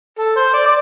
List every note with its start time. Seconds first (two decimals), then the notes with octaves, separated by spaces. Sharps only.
0.19 A4
0.36 C5
0.54 D5
0.66 D5